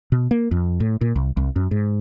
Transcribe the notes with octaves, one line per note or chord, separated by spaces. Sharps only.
B2
A#3
F2
A2
A#2
C2
C2
F#2
G#2